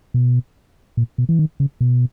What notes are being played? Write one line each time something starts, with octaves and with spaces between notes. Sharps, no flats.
B2
A#2
B2
E3
D#3
C#3
B2